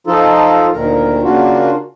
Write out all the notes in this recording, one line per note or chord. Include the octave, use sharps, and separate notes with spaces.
F3 D#4 F4 A4
D2 A#2 D#3 A#4
C#3 A#3 D4 F4 F#4